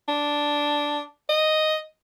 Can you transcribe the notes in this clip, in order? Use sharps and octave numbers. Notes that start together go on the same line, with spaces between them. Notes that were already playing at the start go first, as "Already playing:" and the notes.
D4
D#5